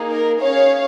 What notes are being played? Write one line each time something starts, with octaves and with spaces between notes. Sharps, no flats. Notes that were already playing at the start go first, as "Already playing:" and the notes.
Already playing: A#3 D#4 G#4
A#4
C#4 G#4 C#5 F5